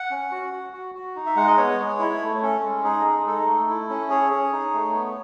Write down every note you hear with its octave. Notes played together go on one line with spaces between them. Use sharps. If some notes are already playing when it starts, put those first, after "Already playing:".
Already playing: F#5
C#4
F#4
F#4
F#4
F#4
D#4
E5
G#3 F#5
D#5
B3 C#5
G#3
E4
A3
C#4 A4
G#3
D#4 G#4
G#3
D#4 A4
A3
E4
C#4
G#4 C#5
G#4
D#4
A3
B3